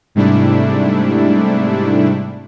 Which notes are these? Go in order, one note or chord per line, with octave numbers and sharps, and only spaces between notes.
G#2 C3 G3 A3 D4 E4